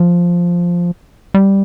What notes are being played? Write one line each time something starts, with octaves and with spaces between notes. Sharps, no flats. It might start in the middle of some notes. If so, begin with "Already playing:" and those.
Already playing: F3
G3